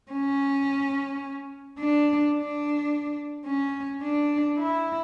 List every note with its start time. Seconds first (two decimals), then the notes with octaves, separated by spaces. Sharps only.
0.12 C#4
1.80 D4
2.34 D4
3.47 C#4
4.03 D4
4.58 E4